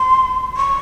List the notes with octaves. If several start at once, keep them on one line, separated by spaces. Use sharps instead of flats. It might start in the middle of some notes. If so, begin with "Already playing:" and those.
Already playing: C6
C#6